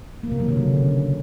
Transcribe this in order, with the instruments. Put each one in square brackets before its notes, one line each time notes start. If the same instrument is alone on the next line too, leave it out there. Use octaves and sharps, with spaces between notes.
[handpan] A#3
C3
F#3
D3
C#3